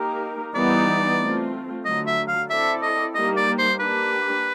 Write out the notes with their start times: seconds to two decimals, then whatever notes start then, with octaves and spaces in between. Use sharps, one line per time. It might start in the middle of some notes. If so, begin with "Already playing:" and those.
Already playing: A#3 D#4 G4 A#4
0.55 E3 G3 B3 D#4 D5
1.20 A3 C4 F4
1.85 D3 F#3 A3 D#5
2.06 E5
2.28 F5
2.49 C4 E4 A4 D5 E5
2.82 D#5
3.14 G3 A#3 D#4 G4 D#5
3.36 D5
3.58 C5
3.79 A#3 D4 G4 B4